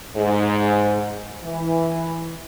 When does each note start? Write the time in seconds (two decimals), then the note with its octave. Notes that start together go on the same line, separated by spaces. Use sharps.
0.16 G#2
1.45 E3